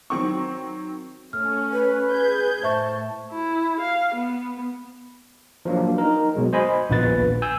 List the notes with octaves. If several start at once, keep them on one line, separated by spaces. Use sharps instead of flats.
D#3 F#3 C4 C#6
A3 C#4 F6
B4
G#4 G6 G#6
A2 C5 E5 A5 C#6
E4
F5
B3
F3 F#3 A#3 D4
D#4 A#4
B2 F#3 G#3
C5 D#5 G#5 B5
A#1 D#2 A#2 B3 B4 A6
G#5 E6 G6